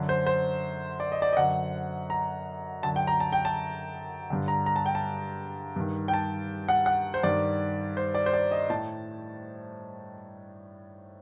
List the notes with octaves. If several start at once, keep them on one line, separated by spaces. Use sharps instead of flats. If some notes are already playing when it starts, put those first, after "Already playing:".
Already playing: F#2 D3
C5
C5
D5
D#5
D5
D#5
F#2 D3 F#5
A#5
F#2 D3 A5
G5
A#5
A5
G5
A5
G2 D3
A#5
A#5
A5
G5
A5
G2 D#3
G5
A5
F#5
F#5
C5
G2 D#3 D5
C5
D5
C5
D5
D#5
A2 A5